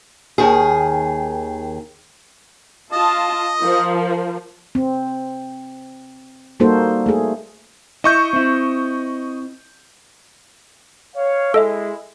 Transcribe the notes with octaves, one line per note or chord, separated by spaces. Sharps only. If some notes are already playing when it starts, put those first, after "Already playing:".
D#2 D#3 G#4
F4 D#5 A5
F3 A#4
C4
G3 A#3 D#4 F#4 A4 C5
A3 G#4
E4 D#5 C#6 G6
C4 E4
C#5 F5
G#3 E4 A4 D#5 E5